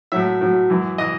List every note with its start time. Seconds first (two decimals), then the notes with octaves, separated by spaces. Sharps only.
0.12 A2 F#3 E5
0.41 A2 F#3
0.70 F#2 E3
0.98 E3 D#5